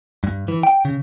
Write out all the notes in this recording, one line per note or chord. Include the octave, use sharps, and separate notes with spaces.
G2
E3
G5
C#3